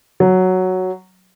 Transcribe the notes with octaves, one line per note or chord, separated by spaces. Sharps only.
F#3